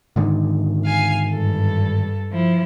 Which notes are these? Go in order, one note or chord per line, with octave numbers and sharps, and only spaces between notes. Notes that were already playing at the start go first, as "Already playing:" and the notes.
G#2 D3 D#3
F5 G#5
G2 A4
F3 E4